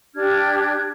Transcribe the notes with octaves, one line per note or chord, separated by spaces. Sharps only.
D4 G4 F6 G#6